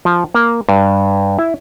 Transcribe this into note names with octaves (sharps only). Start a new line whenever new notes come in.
F3
A#3
G2
E4